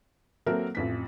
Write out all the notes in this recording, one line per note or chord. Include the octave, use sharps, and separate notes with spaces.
F#3 A#3 C4 A4 A#4 E5
A1 F2 B6